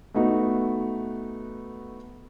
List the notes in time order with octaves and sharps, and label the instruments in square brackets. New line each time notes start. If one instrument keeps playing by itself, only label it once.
[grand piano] A3 B3 D#4 F#4